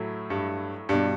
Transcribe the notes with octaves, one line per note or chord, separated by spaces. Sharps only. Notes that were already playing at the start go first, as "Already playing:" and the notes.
Already playing: A2 F#3 A3 E4
G2
G2 B2 G3 D4